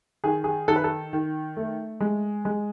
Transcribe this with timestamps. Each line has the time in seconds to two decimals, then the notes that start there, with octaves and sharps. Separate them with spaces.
0.24 D#3 G#4
0.44 G#4
0.68 D#3 A4
0.76 B4
0.84 A4
1.13 D#3
1.57 A3
2.00 G#3
2.45 G#3